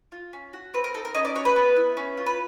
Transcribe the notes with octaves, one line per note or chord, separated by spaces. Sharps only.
F4
C#4
F#4
C4 B4
A#4
D#4 A4
A#4
C#4 D#5
D5
F#4 C#5
B4
B3
E4
C#4
F4
B4